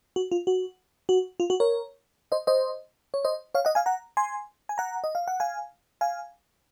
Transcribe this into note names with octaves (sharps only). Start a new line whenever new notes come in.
F#4
F4
F#4
F#4
F4
F#4
A#4 C#5
C5 D#5
C5 D#5
C#5
C5 D#5
C#5 F5
D#5 F#5
F5 G#5
F#5 A#5
G#5 C6
G#5
F#5 A#5
D#5
F5
F#5
F5 G#5
F5 G#5